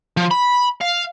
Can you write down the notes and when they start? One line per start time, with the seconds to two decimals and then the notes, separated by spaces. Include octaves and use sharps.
0.17 F3
0.31 B5
0.81 F5